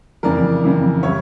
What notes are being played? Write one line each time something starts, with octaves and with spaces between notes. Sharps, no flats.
F2 C#3 E3 A#4 D5
F2 C#3 E3
C#3 G3 C#5 E5